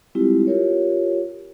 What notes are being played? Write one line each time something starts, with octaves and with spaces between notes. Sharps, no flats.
G3 G#3 C4 E4 F4 G4
F4 G4 A#4 C#5